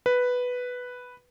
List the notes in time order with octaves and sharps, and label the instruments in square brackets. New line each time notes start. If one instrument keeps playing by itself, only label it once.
[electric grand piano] B4